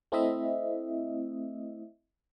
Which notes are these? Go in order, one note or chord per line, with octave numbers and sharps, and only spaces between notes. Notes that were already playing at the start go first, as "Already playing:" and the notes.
A3 C4 E4 D#5 E5